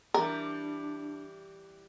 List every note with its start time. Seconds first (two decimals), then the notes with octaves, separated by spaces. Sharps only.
0.14 E3 G3 D4 A#4